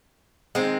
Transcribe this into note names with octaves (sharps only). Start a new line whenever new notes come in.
D#3 G#3 C4